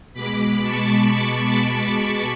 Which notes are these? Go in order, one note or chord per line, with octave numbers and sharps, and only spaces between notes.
B2 G#3 B5 D6
A5 C#6